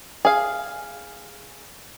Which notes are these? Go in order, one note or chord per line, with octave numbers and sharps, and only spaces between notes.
G#4 F5